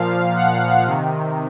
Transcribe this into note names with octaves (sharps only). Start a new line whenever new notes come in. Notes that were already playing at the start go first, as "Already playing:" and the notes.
Already playing: A#2 F3 F5
F#5
C3 D#3